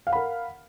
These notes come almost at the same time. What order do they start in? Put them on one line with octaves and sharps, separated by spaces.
F5 F#5 B5 A#4